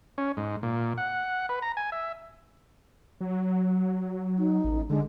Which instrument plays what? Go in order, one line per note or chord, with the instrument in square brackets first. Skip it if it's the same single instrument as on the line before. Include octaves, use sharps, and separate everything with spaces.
[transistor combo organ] C#4
G#2
A#2
F#5
B4
A#5
G#5
E5
[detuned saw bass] F#3
[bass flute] D#4
[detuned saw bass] A1
[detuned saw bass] D3 [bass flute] G#3